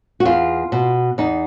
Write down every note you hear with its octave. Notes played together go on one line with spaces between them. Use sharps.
F#4
E2 F4
B2
E2 D#4